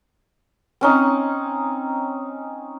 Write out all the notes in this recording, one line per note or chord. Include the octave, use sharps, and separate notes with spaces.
C4 C#4 D#4